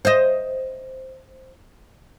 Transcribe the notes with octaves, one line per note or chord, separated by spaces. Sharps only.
C5 D#5